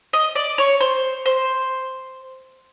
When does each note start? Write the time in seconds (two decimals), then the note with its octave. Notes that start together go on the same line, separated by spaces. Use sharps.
0.13 D#5
0.35 D5
0.58 C#5
0.80 C5
1.26 C5